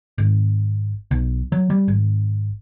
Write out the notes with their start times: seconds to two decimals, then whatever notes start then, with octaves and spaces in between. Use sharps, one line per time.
0.18 G#1
1.11 B1
1.52 F#3
1.70 G3
1.88 G#1